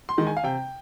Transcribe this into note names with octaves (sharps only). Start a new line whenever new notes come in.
C6
D#3 G#3
G#5
F5
C3 G5